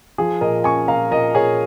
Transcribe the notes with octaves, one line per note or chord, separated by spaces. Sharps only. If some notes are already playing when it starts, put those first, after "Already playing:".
F3 G#4
A#2 A#4 D#5
C#4 G#5 C#6
A#2 F5 A#5
A#2 A#4 D#5
A#2 G#4 C#5